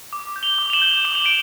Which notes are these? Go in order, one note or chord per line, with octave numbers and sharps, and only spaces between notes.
D6
G6
F7 G7
D6
F7
E7 F#7
G6
D6 E7
F7
D7 E7